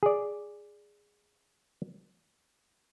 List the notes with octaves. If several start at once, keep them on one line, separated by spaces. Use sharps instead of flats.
G#4 D5